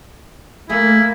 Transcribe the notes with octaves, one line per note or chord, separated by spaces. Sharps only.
A3 A#3 E4 G#4